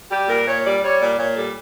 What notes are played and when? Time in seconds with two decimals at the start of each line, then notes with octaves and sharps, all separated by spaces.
0.10 G3 G4
0.28 A#2 A#4
0.46 A#2 C#5
0.65 G3 D5
0.83 G3 C#5
1.01 A#2 D5
1.19 A#2 C#5
1.36 G3 A4